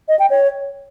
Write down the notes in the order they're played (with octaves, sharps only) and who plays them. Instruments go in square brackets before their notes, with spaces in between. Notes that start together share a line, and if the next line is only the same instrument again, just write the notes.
[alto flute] D#5
G5
C#5